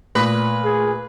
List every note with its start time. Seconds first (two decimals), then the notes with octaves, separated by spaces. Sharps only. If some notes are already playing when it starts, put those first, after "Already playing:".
0.15 A#2 A3 B4 D#6 A#6
0.64 G#4